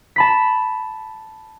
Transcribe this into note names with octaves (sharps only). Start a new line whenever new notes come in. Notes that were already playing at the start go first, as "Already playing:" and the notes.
A5 B5 B6